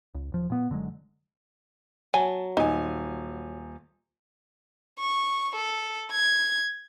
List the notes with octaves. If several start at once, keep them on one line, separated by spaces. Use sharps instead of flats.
C#2
D#1 F3
A#2 B3
F#1 D3 F#3 G#3
F#3 G#5 A5
D#1 D#4 G#5
C#6
A4
G#6